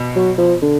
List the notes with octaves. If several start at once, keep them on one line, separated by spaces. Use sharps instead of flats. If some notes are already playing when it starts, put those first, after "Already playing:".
Already playing: B2
F#3
F3
D3